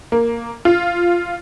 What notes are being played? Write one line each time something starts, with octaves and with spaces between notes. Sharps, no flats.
A#3
F4